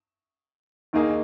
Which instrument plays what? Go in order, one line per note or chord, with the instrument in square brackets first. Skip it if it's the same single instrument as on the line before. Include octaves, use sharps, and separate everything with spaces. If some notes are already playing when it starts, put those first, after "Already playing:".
[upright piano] D#2 D#3 A#3 D#4 G#4